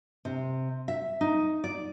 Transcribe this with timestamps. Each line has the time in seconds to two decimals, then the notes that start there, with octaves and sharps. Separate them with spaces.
0.25 C3
0.88 E5
1.21 D#4
1.64 D5